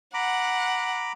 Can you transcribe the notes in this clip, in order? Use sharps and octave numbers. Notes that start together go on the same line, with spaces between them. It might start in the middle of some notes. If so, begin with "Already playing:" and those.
F#5 A#5 B5 D6